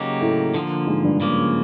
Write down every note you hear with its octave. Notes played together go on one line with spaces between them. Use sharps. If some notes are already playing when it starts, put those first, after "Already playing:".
Already playing: C#3 F#3 A#3 D#4 G4
A2 A3
D3 F3 A#3
G#2 G#3
G2 G3
C#3 F3 A#3